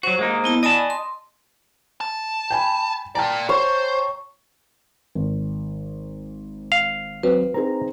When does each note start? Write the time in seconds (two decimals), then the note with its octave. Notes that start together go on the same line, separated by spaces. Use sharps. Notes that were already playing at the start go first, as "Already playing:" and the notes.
0.03 F#3 F#4 C5
0.19 G#3 A#3 D#4
0.44 B3 E4 A5
0.63 D5 D#5 G#5 A5 B5
0.90 C6
2.01 A5
2.50 G5 G#5 B5
3.15 A#4 D5 G5 A5 A#5
3.49 C5 C#5
5.15 G#1
6.72 F5
7.23 F#3 C4 B4
7.54 C4 D#4 G#4 A#5